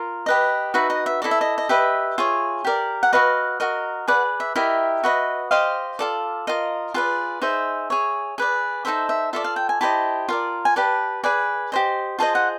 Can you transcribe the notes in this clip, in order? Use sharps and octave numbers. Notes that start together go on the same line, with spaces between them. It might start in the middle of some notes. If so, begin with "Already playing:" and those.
Already playing: F4 A#4
G4 B4 D#5
D#4 F#4 B4 E5
D#5
E5
E4 A4 D5 D#5
E5
D#5
D#5
G4 B4 D#5 E5
F4 G#4 C#5
G4 A#4 D5
F#5
F#4 B4 D#5 F5
F#4 A#4 D#5
G#4 B4 D5 F#5
E5
E4 G4 A#4 D#5 E5
F#4 B4 D#5
G4 C5 D#5 F5
F4 A4 D5
F4 A#4 D#5
F4 G#4 B4 D5
D#4 G#4 C5 E5
G#4 C#5
G#4 B4 D5
D#4 F#4 A4 C5 E5
E5
F4 A4 D5 E5
F5
G5
G#5
E4 G4 C5 D#5 A5
F4 A#4 D5
G#5
G4 B4 D5 A5
G#4 B4 D5 G#5
G4 C5 D#5
F4 G#4 C5 D#5 A5
F#5